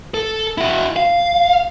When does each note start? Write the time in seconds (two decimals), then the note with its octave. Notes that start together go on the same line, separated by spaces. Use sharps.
0.14 A4
0.58 E4 F#4
0.96 F5